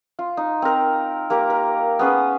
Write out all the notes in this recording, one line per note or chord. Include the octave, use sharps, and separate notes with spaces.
F4
D#4
C4 A#4
A#3 G4 A#4
A#4
B3 C#4 G#4 B4